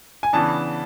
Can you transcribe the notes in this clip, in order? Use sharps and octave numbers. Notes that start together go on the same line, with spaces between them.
G#5
C#3 E3 B3 D4 A5